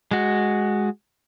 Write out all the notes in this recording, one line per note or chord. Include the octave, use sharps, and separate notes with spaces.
G#3 F#4